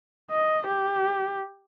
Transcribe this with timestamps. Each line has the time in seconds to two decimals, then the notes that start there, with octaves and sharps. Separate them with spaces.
0.31 D#5
0.68 G4